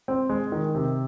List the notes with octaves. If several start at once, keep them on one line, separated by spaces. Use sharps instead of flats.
C4
G#3
D#3
C3